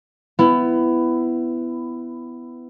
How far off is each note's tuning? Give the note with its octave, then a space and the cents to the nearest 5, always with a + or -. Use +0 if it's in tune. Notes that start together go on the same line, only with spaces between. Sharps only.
B3 +20 E4 +15